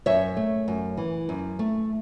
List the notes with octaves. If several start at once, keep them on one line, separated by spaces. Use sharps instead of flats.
F#2 C#5 E5
A3
F#2
E3
F#2
A3